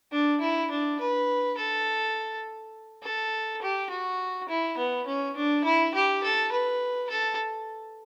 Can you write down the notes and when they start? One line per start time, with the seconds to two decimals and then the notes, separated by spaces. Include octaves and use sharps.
0.12 D4
0.41 E4
0.71 D4
1.00 B4
1.58 A4
3.03 A4
3.62 G4
3.90 F#4
4.49 E4
4.78 B3
5.07 C#4
5.36 D4
5.64 E4
5.94 G4
6.23 A4
6.52 B4
7.10 A4